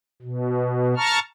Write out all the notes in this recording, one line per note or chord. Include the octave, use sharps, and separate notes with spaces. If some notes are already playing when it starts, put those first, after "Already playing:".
B2
A5 A#5 C#6 F6